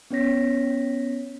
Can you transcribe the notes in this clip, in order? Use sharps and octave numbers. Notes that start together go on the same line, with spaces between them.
B3 C#4 C#5 A#6 B6